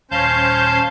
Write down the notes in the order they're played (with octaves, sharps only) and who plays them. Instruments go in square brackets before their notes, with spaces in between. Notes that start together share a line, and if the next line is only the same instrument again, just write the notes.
[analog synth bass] D#1 [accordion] C#4 C5 G6 [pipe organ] F5 A5